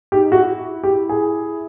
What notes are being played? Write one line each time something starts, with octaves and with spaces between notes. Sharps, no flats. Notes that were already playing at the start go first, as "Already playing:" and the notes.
D#4 G4
E4 F#4
G4
G#4